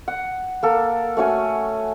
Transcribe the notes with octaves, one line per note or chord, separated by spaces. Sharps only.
F#5
A#3 A4
A3 C#4 F#4 G#5